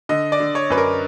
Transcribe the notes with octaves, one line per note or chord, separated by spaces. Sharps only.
D3 D#5
D5
D3
C#5
F#2 B4
A#4